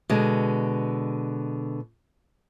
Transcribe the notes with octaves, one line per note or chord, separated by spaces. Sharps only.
B2 D3 G#3